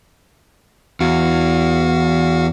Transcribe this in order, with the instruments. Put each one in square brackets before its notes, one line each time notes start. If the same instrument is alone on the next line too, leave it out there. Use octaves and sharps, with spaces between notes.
[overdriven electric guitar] E2 [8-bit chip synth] F#4 F5